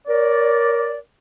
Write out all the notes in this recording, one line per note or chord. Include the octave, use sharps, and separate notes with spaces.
A#4 C#5 D5